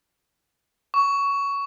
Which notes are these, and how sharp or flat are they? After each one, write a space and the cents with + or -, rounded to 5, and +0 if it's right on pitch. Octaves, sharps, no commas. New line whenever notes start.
C#6 +15